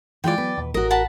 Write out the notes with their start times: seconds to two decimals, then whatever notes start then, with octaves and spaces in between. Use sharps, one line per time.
0.24 E3 G#3 F4 D5 G5
0.38 F#3 B3 B4
0.58 D#2 A#2
0.74 A1 F#4 A#4 D#5
0.91 F#5 A5 B5